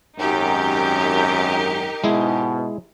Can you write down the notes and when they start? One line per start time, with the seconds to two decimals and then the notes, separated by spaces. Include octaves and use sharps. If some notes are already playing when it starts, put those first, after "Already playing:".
0.19 G#1 F#2 D#4 G4 A#4
2.04 G#2 B2 G#3 E4 G#4